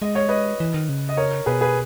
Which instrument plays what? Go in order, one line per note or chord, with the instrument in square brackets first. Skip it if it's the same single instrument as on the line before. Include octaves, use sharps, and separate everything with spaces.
[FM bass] G#3 [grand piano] D#5
[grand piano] C#5
B4 D#5
[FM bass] E3
D#3
C#3
[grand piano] D#5
A#4 C#5
[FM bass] B2 [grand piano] G#4 B4
[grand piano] G#4 B4